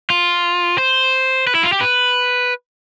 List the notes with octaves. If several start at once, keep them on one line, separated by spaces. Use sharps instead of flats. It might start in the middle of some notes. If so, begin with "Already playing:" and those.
F4
C5
B4
E4
F4
G4
B4